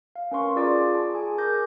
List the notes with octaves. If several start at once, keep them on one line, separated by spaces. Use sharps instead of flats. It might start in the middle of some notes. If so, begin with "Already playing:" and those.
F5
C#4 A#4 B4 F5 C6 C#6
F4 G#4 D5 A#5 D6
A5
G#4 G#5
A#4 D6 G6 A#6